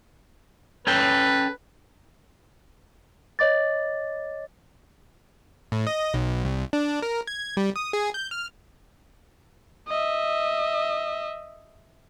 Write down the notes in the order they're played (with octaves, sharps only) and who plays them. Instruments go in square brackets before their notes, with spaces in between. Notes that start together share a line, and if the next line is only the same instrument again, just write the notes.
[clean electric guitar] C#4 A4 G5 [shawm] B4
[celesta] C#5 D#5 D6 A6
[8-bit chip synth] A2
D#5
B1
C2
D4
A#4
G#6
G3
D#6
G#4
G6
F6
[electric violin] D#5 E5